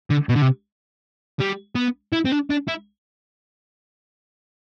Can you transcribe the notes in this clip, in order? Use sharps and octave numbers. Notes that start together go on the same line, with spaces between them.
D3
B2
D3
C3
G3
B3
E4
C4
D4
D4
E4